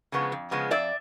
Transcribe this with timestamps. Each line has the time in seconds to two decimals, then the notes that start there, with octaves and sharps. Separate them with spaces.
0.12 C#3 F3 G#3 B3
0.32 F2
0.51 C#3 F3 G#3 B3
0.71 F2 D5 E5